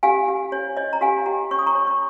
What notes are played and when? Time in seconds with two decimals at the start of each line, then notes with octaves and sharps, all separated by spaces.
0.03 G4 F5 G#5
0.28 G4
0.52 C#5
0.77 C#5 D#5
0.93 A#5
1.01 G4 F5 G#5
1.26 G4 G5 A#5
1.51 C#5 C#6
1.59 D#6
1.66 A#5 C#6
1.75 C#5
1.87 C#6